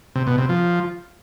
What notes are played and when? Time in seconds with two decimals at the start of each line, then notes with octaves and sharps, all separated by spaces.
0.16 C3
0.27 B2
0.38 C3
0.49 F3